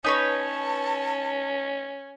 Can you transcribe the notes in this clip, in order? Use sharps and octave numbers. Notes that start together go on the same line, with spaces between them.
C#4 D#4 B4 C#5 A5